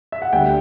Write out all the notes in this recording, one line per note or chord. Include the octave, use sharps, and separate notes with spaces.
E5
F#5
D2 D3 G3 G5